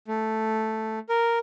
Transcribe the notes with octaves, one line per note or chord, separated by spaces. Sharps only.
A3
A#4